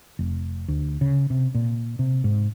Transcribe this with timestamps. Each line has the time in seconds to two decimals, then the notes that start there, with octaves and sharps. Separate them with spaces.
0.19 F1
0.68 D2
1.01 C#3
1.30 C3
1.55 A#2
1.99 C3
2.24 G#2